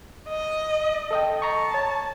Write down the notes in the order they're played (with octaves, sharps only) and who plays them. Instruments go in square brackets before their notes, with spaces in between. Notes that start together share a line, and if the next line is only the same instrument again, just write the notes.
[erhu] D#5
[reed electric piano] A4 D#5 G5
[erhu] A5 [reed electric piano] A#5 C#6
[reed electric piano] C#5